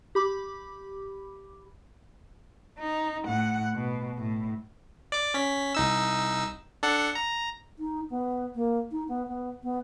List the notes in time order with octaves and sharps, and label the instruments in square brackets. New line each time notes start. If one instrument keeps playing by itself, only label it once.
[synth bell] G4 B5 D6
[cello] D#4
A2 F#5
B2
A2
[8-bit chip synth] D5 D6
C#4 B6
C2 D#4 E6
D4 A4 F#5
A#5
[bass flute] D#4
B3
A#3
D#4
B3
B3
B3